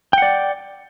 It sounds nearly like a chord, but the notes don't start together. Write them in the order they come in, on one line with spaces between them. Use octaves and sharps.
G5 F#5 D5